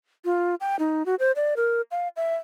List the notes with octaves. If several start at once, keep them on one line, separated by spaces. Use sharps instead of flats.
F4
G5
D#4
F#4
C5
D5
A#4
F5
E5